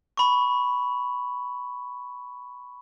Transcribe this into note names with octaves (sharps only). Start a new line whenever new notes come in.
B5 C#6